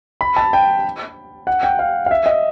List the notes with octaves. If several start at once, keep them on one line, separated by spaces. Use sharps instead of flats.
B5
A5
G5
F#5
G5
F5
F5
E5
D#5